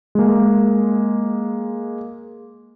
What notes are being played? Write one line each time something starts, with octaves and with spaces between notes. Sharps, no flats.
G#3 A#3